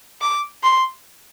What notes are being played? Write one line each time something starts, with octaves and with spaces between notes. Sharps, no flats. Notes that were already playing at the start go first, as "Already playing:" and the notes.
D6
C6